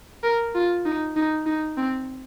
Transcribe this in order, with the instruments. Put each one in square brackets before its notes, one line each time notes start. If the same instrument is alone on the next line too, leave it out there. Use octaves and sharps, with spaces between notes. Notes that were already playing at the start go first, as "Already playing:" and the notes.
[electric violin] A#4
F4
D#4
D#4
D#4
C4